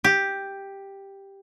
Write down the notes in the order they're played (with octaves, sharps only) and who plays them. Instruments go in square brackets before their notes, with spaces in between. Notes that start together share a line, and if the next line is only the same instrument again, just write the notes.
[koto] G4